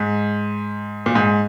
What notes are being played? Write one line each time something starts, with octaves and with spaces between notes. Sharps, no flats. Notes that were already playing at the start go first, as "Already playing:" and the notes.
Already playing: G#2
A#2
G#2